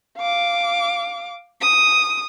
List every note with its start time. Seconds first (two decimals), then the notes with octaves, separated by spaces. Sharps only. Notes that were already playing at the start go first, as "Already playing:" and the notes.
0.18 F5 D6
1.62 D#6